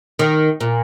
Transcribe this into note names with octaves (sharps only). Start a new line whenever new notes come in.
D#3
A#2